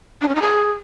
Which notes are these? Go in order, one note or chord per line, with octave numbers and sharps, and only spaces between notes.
D4
C#4
D#4
G#4